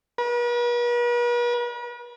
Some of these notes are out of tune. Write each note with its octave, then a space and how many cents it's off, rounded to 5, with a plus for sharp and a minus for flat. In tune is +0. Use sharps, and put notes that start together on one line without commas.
B4 -45